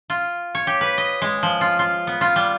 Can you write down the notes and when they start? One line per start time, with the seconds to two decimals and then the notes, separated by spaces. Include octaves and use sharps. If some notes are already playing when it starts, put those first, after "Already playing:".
0.10 F4
0.55 C#5
0.67 G4
0.81 B4
0.98 D#5
1.22 G#3
1.43 F3
1.61 F4
1.79 F4
2.07 B3
2.21 F4
2.36 G3